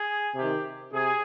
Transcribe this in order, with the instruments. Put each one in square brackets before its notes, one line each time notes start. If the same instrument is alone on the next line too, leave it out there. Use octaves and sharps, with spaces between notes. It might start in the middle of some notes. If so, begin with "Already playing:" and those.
Already playing: [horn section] G#4
C3 D#3 G4
C3 G#4